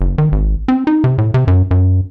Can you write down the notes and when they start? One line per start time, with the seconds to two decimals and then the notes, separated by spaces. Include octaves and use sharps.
0.01 F#1
0.18 D#3
0.32 G#1
0.68 C4
0.87 D#4
1.04 C3
1.18 A2
1.34 C3
1.47 F#2
1.71 F#2